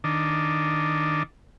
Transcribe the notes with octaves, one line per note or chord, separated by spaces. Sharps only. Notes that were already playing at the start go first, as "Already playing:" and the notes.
D#3 D4